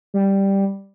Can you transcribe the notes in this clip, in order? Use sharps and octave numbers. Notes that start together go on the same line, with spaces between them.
G3